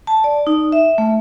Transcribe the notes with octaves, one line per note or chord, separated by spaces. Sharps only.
A5
D5
D#4
E5
A3